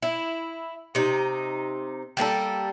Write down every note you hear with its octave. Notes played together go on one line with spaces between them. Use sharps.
E4
C3 D#4
G3 A#3 D#4 A4